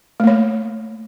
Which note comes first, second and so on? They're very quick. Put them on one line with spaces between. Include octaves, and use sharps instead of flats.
A3 A#3 C#5